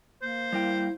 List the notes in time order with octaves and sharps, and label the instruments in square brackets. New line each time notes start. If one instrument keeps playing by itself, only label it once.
[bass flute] A#3 [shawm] C5
[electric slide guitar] G3 A#4 G5 [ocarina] E4